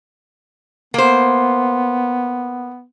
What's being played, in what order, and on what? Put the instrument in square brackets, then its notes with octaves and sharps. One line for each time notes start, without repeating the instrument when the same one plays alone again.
[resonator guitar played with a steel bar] A#3 C5 [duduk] B3